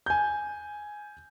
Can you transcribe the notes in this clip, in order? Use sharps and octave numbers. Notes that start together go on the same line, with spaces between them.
G#5 G6